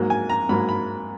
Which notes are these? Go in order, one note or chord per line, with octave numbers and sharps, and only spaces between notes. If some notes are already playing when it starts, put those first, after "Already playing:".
Already playing: G#2 F#3 A#3
G#5
A#5
G#2 F#3 A#3 B5
B5